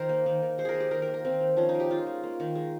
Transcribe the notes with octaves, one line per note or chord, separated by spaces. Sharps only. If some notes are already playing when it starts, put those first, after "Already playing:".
Already playing: D#3 A#4 C5
A#3
D#3
D#3
G#3 C5
G#4 A#4
G#3
G4
D#3 A#4
A#4
A#3
A#4
D#3 C4
D#3
F3 C#4
D#4
A#3
G4
G#3 F4
G#3
A#3
D#3
G#3